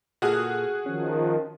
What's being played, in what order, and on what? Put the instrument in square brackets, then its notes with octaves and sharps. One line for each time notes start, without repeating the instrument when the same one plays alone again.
[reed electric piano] A#2 A4 F6 [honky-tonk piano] F#4 G#4 D#6
[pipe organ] D#3 F3 [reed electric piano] C#4